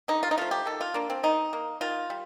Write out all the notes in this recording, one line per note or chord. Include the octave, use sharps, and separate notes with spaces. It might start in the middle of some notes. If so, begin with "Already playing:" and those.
D3 D#4
F4
D#4
F3 A3 F4
G4
D#3 A4
F4
A#3 D4
C4
D#3 D#4
A#3
D#3 F4
G3